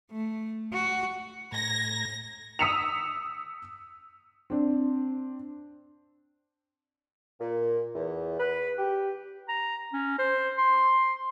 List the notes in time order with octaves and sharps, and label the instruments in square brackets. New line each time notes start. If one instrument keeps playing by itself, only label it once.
[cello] A3
F#4
[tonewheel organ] A2 A#5 G#6 [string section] A#6
[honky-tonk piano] D#6 E6 B6 C#7 E7 F7
[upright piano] C4 D4
[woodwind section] A#2
E2
B4
G4
[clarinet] A#5
C#4
C5
C6